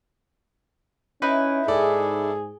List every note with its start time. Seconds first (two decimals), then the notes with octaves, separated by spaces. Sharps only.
1.22 C#4 D#4 E4 B4
1.68 G#2 G#4 A4 D5